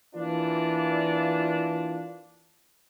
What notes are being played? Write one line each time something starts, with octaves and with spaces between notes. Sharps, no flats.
E3 A#3 D4 F4 D5